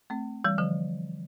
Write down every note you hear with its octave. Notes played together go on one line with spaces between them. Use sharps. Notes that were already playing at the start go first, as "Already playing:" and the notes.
A3 C4
E3 G3
D3 F3